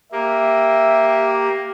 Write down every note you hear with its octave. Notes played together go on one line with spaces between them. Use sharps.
A#3 G4 E5